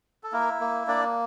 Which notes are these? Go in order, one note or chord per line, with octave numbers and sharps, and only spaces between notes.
A4
A#3 E4 A#4
A#3
A#3 D4 D5